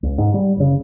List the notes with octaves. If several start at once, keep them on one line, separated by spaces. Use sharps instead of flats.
C#2
G#2
G3
F#1 C#3